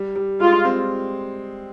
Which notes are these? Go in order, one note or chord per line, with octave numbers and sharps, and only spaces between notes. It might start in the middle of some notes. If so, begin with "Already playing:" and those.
Already playing: G3
G3
G#3 F4
C4